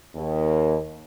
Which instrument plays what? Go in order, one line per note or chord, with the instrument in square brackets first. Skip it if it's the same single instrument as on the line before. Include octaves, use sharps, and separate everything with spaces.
[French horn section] D#2